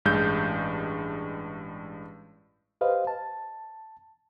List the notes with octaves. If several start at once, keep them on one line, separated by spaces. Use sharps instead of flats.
A1 G2 G#3 G6
G4 B4 C5 D#5 F5
A5